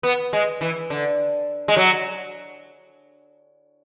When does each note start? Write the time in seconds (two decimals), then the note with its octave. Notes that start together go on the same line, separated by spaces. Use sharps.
0.03 B3
0.33 G#3
0.61 E3
0.90 D3
1.68 G#3
1.77 F#3